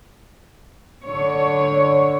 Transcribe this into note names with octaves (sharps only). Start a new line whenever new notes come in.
D3 C#5